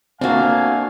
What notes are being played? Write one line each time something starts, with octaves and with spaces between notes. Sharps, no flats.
A3 A#3 C4 D4 F#4 F5 G#5